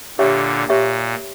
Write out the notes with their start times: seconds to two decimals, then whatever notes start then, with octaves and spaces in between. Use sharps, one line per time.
0.18 A#2 D3 G4 C#5 E5 G5
0.69 A#2 G4 C#5 E5 G5